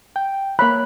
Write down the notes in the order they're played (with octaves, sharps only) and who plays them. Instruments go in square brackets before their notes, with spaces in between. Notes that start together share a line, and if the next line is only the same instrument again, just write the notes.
[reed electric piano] G5
[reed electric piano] A#3 C#5 F#6 [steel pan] B5